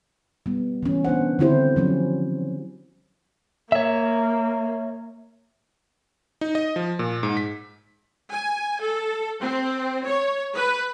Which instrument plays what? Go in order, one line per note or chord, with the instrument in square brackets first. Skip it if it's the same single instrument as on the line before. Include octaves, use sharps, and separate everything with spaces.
[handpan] G3 B3
E3 C#4
B3 D4 C5 F#5
D3 D#3 C4 E4 G4 C5
F3 F#3 C#4
[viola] A#3 [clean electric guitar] C#5 E5
[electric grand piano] D#4
D#5
F3
A#2
G#2
B6
[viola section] G#5
A4
C4
C#5
B4